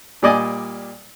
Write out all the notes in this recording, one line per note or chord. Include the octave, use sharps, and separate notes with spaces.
A#2 G3 D5 D#5 G#5 D6